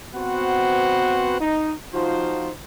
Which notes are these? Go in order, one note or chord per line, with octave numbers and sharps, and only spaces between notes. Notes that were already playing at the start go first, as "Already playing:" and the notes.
B3 C4 F#4 B4 C5 F#5
D#4
F3 D#4 F4 F#4 C5